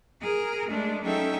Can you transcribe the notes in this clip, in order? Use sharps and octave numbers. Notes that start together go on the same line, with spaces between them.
G#4 A#4
G#3 A3 D4
F#3 C#4 D#4 A4 E5 G5